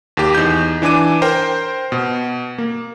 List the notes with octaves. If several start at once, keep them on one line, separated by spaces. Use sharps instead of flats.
D#2 G4
E2 D#4 G6
E3 D4 G#5 D6 D#7
A#4 C5 G5
B2
A#3